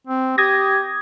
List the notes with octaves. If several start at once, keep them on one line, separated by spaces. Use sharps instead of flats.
C4
G4 D#6 G#6 A#6